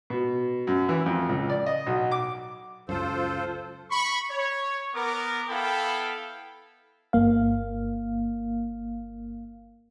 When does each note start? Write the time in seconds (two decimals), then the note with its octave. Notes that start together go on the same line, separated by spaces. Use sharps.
0.10 B2
0.67 F#2
0.89 E3
1.06 F2
1.29 C#2
1.50 D5
1.66 D#5
1.87 B1
2.11 D6
2.89 C#2 F#2 F4 A4 C5
3.91 B5 C#6
4.31 C#5
4.95 B3 A#4 D6
5.49 B3 E4 A4 F5 G5 B5
7.13 G1 A#3 F5